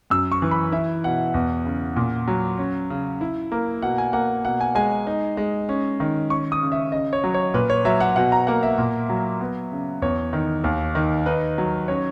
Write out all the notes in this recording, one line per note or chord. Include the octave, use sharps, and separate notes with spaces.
F#2 E6
C#6
E3
B5
E4 E5
B2 F#5
E2
C#3
A#2
F#3
C#4
C#3
E4
A#3
B2 F#5
G#5
A#3 F#5
B2 F#5
G#5
G#3 G#5
D#4
G#3
C#4
D#3
C#4 C#6
D#6
C#3
E5
C#3 D#5
C#5
F#3
C#5
A#2 B4
C#5
F#3 E5
F#5
B2 F#5
A#5
A#3 F#5
E5
A#2
F#3
B3
C#3
E2 C#5
D#3
D#2
D#3
D#4 B4
F#3
C#4 C#5